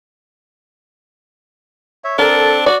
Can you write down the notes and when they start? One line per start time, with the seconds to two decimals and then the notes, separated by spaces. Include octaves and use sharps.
2.04 C#5 E5
2.19 C4 D4 A4 A#4 A5
2.66 F#4 D5